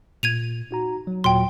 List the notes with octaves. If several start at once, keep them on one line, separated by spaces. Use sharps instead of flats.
A#2 G#6 D#7 F7
D#4 F#4 A#5
F#3
D#2 A#2 F#3 G5 C6